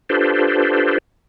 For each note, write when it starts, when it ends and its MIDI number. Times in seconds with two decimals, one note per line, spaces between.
0.10 0.98 62
0.10 0.98 65
0.10 0.98 67
0.10 0.98 69
0.10 0.98 71
0.10 0.98 72